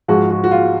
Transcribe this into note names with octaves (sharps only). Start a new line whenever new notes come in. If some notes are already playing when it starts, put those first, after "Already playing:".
G#2 F3 G#3 F#4
F#4
F#4
F4